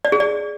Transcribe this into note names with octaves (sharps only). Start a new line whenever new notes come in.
D5
G#4
D5